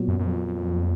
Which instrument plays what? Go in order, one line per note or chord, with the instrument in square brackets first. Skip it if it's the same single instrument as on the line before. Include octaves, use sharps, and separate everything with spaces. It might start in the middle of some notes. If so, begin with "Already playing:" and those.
Already playing: [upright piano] A#2 F#3 B3 F#4
[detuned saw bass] F#2
F#2
F2